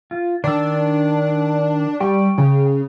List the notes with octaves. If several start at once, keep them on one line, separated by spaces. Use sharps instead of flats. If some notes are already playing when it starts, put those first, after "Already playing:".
F4
D#3 D4 E6
G3 G5 C#6
C#3